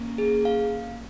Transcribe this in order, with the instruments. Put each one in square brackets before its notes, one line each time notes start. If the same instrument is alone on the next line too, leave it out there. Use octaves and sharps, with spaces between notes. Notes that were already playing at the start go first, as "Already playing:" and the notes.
Already playing: [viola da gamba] A#3 C#4
[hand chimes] G#4
F5